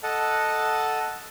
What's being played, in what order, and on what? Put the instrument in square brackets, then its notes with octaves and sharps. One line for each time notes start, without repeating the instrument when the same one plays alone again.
[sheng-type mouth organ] A4 D#5 F#5 A5